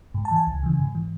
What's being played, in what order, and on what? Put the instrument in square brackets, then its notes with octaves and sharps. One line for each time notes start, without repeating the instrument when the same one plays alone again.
[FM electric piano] G#2
A5
E3 G#5
C#2
C#3 E3
G#2
E3